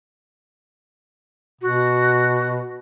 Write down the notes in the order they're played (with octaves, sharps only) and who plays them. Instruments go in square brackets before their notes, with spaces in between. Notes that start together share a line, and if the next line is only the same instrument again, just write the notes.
[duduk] B2 [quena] F#4